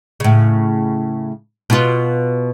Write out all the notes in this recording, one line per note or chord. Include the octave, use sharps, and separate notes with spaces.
A2 C#3
B2 F4